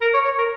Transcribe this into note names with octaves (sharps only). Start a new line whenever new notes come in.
A#4
C#5
C#5
A#4